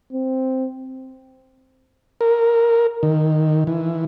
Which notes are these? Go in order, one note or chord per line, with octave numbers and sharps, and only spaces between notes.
C4
A#4
D#3
E3